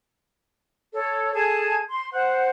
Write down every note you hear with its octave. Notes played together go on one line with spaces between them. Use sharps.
A4 C#5
G#4 A4 A5 G#6
C6
C5 F#5